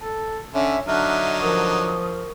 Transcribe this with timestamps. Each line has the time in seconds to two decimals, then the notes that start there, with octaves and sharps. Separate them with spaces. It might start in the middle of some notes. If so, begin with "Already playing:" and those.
0.01 A4 A5
0.54 D3 C#4 C#5 E5
0.87 D3 F#3 D4 D#4 E5 F6 F#6
1.40 F3 A#4 C#6 D#6